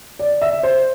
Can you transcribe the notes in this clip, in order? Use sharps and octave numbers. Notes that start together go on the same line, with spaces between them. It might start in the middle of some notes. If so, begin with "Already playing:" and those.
D5
E5
C5